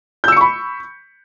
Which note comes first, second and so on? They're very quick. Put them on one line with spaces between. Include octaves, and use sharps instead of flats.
G6 E6 C#7 C#6 B5